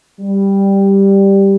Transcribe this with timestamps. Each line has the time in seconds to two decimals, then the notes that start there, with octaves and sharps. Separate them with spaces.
0.21 G3